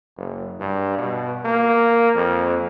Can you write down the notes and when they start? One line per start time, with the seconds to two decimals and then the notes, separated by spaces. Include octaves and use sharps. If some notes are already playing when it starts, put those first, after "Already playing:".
0.17 F#1
0.60 G2
0.98 B2
1.45 A#3
2.15 F2